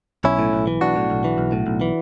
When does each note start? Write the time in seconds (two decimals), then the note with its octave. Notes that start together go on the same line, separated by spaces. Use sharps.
0.24 B1 C#4 E4
0.39 A2
0.53 B1
0.67 E3
0.81 B1 D4 F#4
0.96 A2
1.10 B1
1.24 E3
1.38 B1
1.52 A2
1.67 B1
1.81 E3